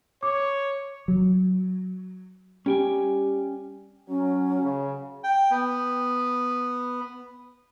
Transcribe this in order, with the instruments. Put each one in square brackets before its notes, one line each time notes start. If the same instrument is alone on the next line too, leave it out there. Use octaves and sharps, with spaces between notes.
[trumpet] C#5 [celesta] D6
[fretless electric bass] F#3
[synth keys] G3 G4 [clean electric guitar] C#4 G5 G#5
[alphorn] F#3 [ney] C#4
[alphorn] C#3
[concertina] G5
B3